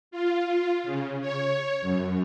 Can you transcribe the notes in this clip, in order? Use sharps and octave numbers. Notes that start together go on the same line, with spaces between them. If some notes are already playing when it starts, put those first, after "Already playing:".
F4
C#3
C#5
F#2